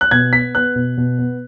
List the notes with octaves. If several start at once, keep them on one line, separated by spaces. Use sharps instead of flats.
F#6
B2 G#6
B3 B6
B3 F#6
B2
B2
B3